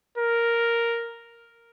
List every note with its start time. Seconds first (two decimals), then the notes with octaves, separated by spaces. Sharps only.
0.18 A#4